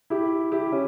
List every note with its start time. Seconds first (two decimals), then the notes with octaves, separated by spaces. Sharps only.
0.10 E4 G4
0.52 E4 G4
0.72 C#4 E4